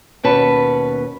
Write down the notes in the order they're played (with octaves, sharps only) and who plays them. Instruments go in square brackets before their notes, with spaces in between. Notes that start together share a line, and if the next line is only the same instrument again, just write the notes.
[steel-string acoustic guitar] D#2 B2 C#4 B4 A5